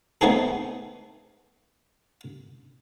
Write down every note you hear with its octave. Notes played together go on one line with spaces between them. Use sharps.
A3 B3 C4 D#4 G#4 A4